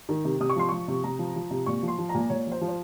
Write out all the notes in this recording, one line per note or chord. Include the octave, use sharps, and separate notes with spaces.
D#3
C3
C3 D#6
C#6
F3 C6
F3 C#6
C3
C3 A#5
F3
F3
C3
A#2 C#6
F3
C6
F3
A#5
A#2
A#2 C#5
F3 C5
F3
C5